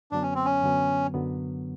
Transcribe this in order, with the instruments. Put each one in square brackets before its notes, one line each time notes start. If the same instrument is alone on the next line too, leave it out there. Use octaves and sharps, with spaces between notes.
[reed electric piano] F#2 D3 F#3 B3 [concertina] D4
[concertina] C#4
C4
C#4
[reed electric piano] F#2 D3 F#3 B3
F#2 D3 F#3 B3